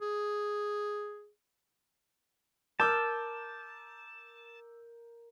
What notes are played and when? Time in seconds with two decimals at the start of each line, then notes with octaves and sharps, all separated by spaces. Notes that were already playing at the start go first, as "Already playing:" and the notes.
0.01 G#4
2.80 A#4 A5 D6 E6 F6 G6